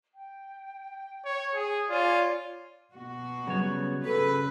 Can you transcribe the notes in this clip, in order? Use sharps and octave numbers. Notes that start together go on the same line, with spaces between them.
G5
C#5
G#4
F4 C#5 D5 G#5
B2 F#4
C#3 F#3 G3 B3 C#5
C#3 A4 B4